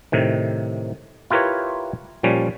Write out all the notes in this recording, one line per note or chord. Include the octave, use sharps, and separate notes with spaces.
A2 C3 D#3
E4 F4 G4 A#4 B4 C#5
A#2 F3 G3 C#4